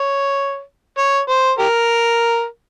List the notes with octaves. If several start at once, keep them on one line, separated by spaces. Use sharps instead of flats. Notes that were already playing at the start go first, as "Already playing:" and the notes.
Already playing: C#5
C#5
C5
G4 A#4